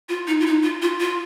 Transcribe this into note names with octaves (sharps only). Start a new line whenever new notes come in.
F4
D#4
F4
D#4
F4
F4
F4